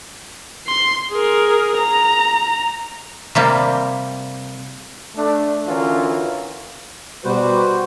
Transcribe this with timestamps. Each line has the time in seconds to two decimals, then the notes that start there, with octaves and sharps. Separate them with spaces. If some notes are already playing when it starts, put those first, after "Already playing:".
0.67 C6
1.12 G#4 A#4
1.77 A#5
3.35 C3 G3 A#3
5.16 A3 D4
5.67 D3 E3 C#4 F4 F#4 A#4
7.25 B2 G3 F#4 B4 C5